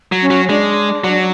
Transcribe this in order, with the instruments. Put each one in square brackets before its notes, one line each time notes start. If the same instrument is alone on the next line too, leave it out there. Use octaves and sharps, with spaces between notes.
[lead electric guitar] F#3
[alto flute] C#4
[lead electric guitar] F#3
[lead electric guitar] G#3 [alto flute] D4
[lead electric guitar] F#3